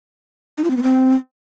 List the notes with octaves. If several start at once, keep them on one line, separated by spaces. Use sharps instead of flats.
D#4
F4
C4
B3
C4